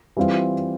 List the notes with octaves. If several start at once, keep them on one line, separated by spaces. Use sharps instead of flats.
E3 G3 C4 F4